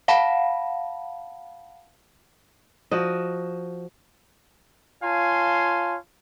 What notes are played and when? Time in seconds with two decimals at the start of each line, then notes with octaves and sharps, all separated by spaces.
0.08 F5 F#5 A5 B5
2.91 F3 F#4 D#5
5.03 F4 C#5 F5 G#5 A5 C6